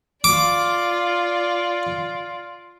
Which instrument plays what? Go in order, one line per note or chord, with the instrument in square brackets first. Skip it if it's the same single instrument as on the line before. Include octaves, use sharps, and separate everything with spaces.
[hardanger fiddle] F4 D5 [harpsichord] D6